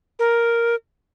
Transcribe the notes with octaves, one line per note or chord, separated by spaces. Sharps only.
A#4